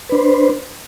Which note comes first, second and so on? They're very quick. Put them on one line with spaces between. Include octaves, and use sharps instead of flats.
B4 D4 C5